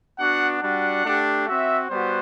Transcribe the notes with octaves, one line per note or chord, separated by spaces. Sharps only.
B3 D4 F#4 F#5
G3 D4 F#4 F#5
A3 D4 G4
C4 F#4 E5
G3 B3 F#4 C5